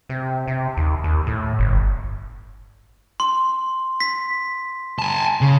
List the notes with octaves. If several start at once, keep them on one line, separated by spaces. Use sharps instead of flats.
C3
C3
D#2
D#2
A2
G1
C6
B6
G#5 A5
C#3